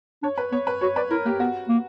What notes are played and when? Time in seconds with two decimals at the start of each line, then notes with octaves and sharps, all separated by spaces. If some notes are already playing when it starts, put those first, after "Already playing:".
0.23 D4 C#5
0.38 B4
0.52 B3 C#5
0.67 B4
0.81 F#4 C#5
0.96 B4 D5
1.11 E4 A#4
1.25 A#3 G4
1.40 B3 F#4
1.69 A#3